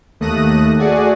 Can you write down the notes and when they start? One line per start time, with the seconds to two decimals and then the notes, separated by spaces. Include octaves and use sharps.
0.20 D#2 A3 D#6 F#6 A#6 D#7
0.79 A3 F#4 G#4 D5 F#5 G#5